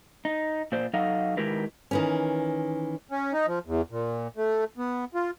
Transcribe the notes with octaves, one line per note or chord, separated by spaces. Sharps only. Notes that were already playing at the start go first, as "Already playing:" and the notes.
D#4
A#2 C5 D5
F#3 D#4 A4 D#5 F5
D#3 G#3 E4 G4 A#4 B4
D#3 E3 C#4
C#4
D#4
F3
E2
A#2
A3
B3
F4